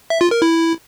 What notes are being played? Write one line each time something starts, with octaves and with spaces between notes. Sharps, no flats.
E5
F4
A#4
E4